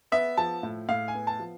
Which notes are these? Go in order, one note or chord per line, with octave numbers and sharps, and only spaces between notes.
B3 E5
F3 A5
A2
A2 F5
G#5
B3
A5
F3